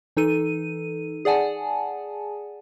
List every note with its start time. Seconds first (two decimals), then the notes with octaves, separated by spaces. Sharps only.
0.17 E3 D#4 A4 D#7
1.25 G#4 D5 F#5 G#5 A5